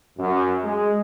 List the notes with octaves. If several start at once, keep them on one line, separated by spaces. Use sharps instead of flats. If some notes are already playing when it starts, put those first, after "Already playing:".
F#2
G#3